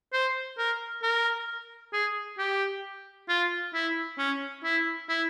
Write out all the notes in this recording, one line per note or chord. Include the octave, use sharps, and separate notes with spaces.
C5
A#4
A#4
G#4
G4
F4
E4
C#4
E4
E4